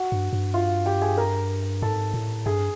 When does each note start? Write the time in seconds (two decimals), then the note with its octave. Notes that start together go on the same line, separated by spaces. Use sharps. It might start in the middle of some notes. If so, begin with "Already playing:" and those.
Already playing: F#4 F#5
0.12 G2
0.33 G2
0.54 F4 F5
0.86 G4 G5
1.01 G#4 G#5
1.17 A#4 A#5
1.82 G#2 A4 A5
2.14 A2
2.46 G2 G#4 G#5